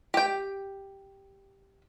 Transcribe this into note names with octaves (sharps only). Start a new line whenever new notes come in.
G4 G5